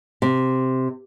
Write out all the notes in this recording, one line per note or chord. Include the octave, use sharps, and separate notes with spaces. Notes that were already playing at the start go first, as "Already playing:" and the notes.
C3